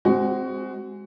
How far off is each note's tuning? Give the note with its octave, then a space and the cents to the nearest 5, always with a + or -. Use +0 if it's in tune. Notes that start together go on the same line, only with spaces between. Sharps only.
G#3 -10 C4 +0 F#4 +20